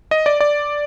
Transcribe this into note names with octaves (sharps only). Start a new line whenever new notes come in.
D#5
D5
D5